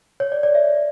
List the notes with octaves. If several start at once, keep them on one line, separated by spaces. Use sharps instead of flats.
C#5
D5
D5
E5